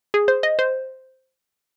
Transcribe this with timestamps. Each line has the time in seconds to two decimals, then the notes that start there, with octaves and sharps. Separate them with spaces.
0.14 G#4
0.28 C5
0.43 D#5
0.59 C5